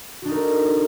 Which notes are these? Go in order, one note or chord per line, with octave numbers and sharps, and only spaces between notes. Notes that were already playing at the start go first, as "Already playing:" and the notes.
A3 D4 D#4 F#4 A#4